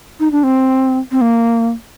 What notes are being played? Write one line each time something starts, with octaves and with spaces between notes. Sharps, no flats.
D#4
D4
C4
C4
A#3